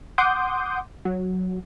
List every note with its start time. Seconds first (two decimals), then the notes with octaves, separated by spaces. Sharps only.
0.18 F#5 C6 D6 D#6 G6
1.05 F#3